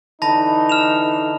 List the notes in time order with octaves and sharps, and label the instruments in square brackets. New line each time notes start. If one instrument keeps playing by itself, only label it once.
[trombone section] D3 E3 D#4 [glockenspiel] A5 B5 A#6
[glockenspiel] F6 E7 F7